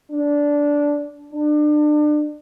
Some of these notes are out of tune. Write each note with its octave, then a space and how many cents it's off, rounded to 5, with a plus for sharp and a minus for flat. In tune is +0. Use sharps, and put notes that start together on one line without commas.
D4 -10
D4 +30